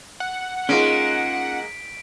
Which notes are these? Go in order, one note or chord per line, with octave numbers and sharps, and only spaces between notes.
F#5
G#3 A#3 C#4 D#4 F4 B6 D7